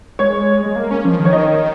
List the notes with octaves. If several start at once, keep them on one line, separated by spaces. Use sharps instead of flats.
G#3 C#5
G#3
A#3
C#4
F3
D#3
C#5
D#5